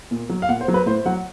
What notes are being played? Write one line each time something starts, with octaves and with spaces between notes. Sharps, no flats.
A#2
F#3
F5
A#2 F#5
C5
F#3
B4
A2 C5
F#3 F#5